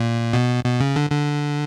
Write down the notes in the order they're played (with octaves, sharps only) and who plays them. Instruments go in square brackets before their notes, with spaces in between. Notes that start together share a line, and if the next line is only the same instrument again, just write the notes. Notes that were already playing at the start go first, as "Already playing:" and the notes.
Already playing: [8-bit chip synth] A#2
B2
B2
C#3
D3
D3